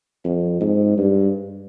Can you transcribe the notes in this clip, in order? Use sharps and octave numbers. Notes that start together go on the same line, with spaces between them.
F2
G#2
G2